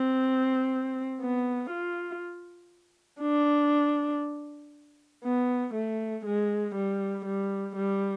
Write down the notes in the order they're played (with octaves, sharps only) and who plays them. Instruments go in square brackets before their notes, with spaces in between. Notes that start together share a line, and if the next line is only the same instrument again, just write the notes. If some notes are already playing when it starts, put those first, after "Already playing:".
Already playing: [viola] C4
B3
F4
D4
B3
A3
G#3
G3
G3
G3